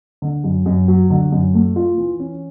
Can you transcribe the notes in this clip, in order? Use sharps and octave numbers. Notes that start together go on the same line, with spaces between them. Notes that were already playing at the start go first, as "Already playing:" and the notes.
D3
F#2
F#2
F#3
D3
F#2
A3
F4
E3
C#4